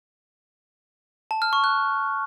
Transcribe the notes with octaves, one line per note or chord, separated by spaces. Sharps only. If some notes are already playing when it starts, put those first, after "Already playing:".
A5
F6
C#6
F#6